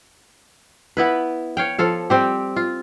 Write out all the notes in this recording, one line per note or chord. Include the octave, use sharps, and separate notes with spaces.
B3 E4 B4
C#5 F5 G5
F3 A4 F5
G3 C4 G4
F4